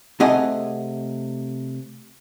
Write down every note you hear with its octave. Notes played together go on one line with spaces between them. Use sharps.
C3 A3 G#4 D#5 F#5